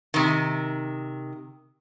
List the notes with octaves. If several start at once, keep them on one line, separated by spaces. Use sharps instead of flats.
C3 D#3